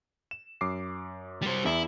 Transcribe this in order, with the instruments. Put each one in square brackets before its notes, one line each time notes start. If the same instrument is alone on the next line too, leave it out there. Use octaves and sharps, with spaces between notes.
[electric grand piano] E7
F#2 D6 C7
[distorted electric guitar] G3 C5
[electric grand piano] E2 [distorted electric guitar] E4